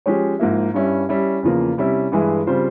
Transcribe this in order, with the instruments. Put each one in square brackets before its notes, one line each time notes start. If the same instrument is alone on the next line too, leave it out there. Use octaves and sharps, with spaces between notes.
[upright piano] F3 G#3 C#4 G4 C#5
G#2 F3 A#3 E4
G2 G3 C#4 E4
G3 C#4 E4
E2 C#3 F3 A#3
C3 G3 C#4 E4
G2 E3 G#3 E4 G#4
C#3 G3 C4 F4 C5